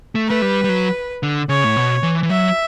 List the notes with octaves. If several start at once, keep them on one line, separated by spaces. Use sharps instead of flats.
A3
A3 B4
G3
G3
F#3
D3
C#3 C#5
A2
B2
E3
E3
F#3 E5